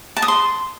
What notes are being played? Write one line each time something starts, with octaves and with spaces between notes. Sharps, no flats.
A5
D#6
C6